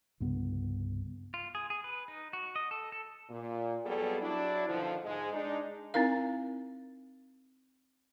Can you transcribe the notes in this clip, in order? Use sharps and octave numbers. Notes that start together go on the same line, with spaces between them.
C2 G2 C#3 B3
F4
G#4
G#4
B4
D#4
F#4
D#5
A4
A4
A#2
F2 F#3 G3 B3 G#4 A4
F#3 D4 E4
B2 D3 D#3 F3
G#2 G#3
G#3 D4 D#4
C4 D#4 E4 A#4 F5